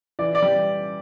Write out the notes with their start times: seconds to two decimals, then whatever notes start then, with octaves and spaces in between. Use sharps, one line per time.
0.19 E3 D5
0.35 D5
0.42 G3